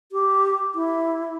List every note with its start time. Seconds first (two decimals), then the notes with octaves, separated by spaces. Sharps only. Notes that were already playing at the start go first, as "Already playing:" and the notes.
0.12 G4
0.75 E4